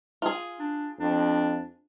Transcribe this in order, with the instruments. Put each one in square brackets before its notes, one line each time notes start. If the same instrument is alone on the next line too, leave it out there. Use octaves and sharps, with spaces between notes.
[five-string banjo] F4 G#4
[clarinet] D4
[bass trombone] F2 [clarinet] D4